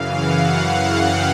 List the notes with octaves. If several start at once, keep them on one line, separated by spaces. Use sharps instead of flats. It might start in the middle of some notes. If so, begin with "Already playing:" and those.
Already playing: F#2 C#3 E3 F5
F#5
F#5
G5